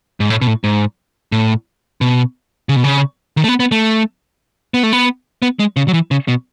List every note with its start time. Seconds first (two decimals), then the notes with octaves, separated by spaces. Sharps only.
0.20 G#2
0.30 A2
0.41 B2
0.47 A2
0.64 G#2
1.32 A2
2.01 B2
2.69 C#3
2.76 B2
2.84 C#3
3.37 D#3
3.44 A3
3.49 B3
3.60 B3
3.72 A3
4.74 B3
4.83 A3
4.93 B3
5.42 B3
5.59 G#3
5.77 C#3
5.88 F#3
5.93 E3
6.11 C#3
6.28 B2